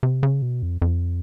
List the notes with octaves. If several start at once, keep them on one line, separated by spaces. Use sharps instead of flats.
C3
C#3
B2
F2
F2